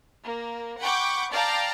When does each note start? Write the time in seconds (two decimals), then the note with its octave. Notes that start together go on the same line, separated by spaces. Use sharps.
0.24 A#3
0.80 F#5 G5 B5 C#6 D6 G6
1.31 D5 F5 G5 A5 A#5